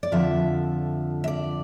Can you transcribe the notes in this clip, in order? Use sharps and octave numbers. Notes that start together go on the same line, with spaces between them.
D5
F2 D3 F3 E5
E5
D5